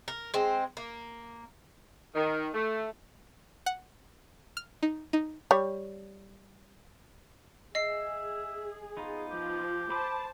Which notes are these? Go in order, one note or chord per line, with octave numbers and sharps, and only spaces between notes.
A#4
G#3 C4
A#3
D#3
A3
F#5
F6
D#4
D#4
G3 C#5
G#4 D#5 E5 C7
B3 D#4 F4
F3 G4
C5 A5 B5 D6